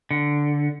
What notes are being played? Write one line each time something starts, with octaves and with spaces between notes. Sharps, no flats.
D3